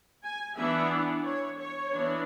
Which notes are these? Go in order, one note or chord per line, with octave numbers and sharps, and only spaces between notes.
G#5
E3 B3 D4 E5
C#5
C#5
E3 B3 D4